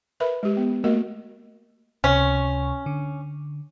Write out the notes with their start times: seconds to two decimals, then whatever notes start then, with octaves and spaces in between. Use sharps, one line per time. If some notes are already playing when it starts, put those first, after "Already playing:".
0.20 A#4 B4 E5 B5
0.43 G#3 G4
0.57 B3
0.84 A3 A#3 F#4 A#4 D#5
2.04 C#2 C3 C#4 C#6
2.86 D3